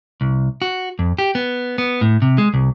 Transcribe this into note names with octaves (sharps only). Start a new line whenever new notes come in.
C2
F#4
F2
G4
B3
B3
A2
C3
G#3
C2